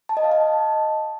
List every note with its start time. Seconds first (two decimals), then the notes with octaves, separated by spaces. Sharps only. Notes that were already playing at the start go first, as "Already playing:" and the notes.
0.09 A5
0.17 D#5
0.24 F5
0.32 A5